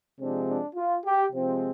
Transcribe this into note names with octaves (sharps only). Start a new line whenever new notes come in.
C3 F3 G#3 C4 D4
D4
F4
G4
C3 F3 G#3 C4